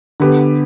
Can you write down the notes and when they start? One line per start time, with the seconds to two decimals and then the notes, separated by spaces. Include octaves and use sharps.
0.20 D3 B3 G4 B4